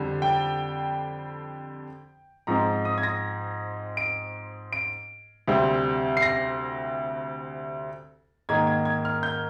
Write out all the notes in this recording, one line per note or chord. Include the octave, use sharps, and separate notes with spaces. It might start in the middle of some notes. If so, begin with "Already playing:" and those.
Already playing: F2 D3 G3
G5
G#2 F3 G#3 C4 A#5
D#6
G#6
A#6
D7
D7
D2 C3 G3 C4
C7
A#6
G#2 D#3 A#3 G#6
G#6
G#6
F6
G6